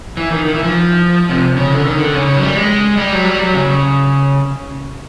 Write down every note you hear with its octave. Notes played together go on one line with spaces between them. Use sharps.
E3
D#3
D#3
E3
F3
C3
C#3
D3
D#3
D3
C#3
C#3
F#3
G3
G#3
G3
F#3
G3
F#3
C#3